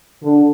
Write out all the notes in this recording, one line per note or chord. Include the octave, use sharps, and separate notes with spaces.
D3